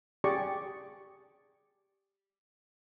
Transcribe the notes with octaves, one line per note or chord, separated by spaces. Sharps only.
G4 G#4 D5 C#6